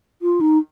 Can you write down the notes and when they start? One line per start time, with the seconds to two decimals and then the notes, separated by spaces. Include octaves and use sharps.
0.22 F4
0.41 D#4